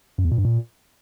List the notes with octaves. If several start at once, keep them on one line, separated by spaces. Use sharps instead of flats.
F#2
E2
A#2
G2
A#2